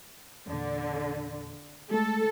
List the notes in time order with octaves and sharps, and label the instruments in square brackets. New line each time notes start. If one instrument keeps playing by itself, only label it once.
[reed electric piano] E2 A#2 [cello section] D3
[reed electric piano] G#3 A3 [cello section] A4